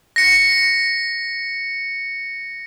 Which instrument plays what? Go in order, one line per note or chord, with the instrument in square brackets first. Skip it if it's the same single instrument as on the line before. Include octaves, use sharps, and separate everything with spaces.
[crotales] A#6 C#7